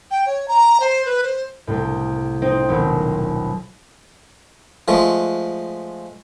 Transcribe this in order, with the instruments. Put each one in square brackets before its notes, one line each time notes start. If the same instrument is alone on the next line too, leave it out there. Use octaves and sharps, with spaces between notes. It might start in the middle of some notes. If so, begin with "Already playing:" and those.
[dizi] G5
C#5
A#5
C5
B4
C5
[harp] C2 A2
C4 D#4 C5
D#1 B1
[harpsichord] F3 G#3 A3